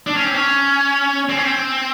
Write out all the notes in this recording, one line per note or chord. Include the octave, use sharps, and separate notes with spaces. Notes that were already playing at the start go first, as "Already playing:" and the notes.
D4
C#4
C4
C#4
C4
C#4
C4